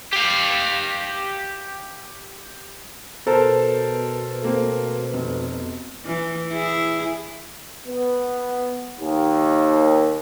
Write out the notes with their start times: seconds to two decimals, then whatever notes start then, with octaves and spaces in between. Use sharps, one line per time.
0.13 G4 F5
3.27 B2 A4 A#4 C5 A5
4.42 A3 A#3 C4
5.14 F1
6.05 E3
6.53 E4 G#4
7.87 B3
9.00 D#2